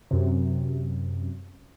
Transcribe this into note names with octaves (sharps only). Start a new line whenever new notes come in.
F#2 C3